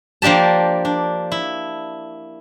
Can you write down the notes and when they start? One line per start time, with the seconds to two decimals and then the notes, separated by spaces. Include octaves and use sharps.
0.22 F3 A#3 D4 G4 A5
0.85 D4
1.32 E4